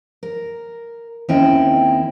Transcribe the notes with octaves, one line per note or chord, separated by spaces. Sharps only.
A#4
D#2 C4 C#4 E4 D#5 G5